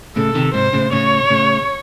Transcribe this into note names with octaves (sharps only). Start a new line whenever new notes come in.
A2 C#3 A4
C3 D#3
G#2 C3 C5
A2 C#3
A2 C#3 C#5
A2 C#3